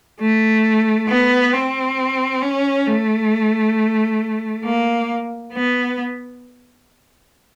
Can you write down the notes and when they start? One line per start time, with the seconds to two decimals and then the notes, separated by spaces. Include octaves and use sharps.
0.20 A3
1.08 B3
1.53 C4
2.42 C#4
2.87 A3
4.65 A#3
5.53 B3